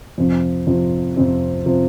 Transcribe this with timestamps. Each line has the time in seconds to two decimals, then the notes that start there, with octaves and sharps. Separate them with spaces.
0.18 F2 C3 F3 C4
0.67 F2 C3 F3 C4
1.16 F2 C3 F3 C4
1.66 C3 F3 C4